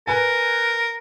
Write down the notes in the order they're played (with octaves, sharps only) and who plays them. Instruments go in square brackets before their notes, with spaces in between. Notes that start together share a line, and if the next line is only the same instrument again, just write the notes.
[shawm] A#4 [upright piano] B4 G#5